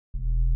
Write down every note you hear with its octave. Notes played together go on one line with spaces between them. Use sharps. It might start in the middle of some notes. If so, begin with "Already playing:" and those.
E1